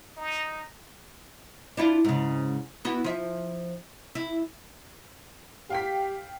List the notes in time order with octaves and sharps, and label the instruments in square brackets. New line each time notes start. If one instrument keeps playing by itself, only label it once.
[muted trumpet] D#4
[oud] D4 E4 F4
G#2 C#3
B3 E4 F#4
F3 E5
E4
[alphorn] G4 [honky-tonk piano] F5 G5 B6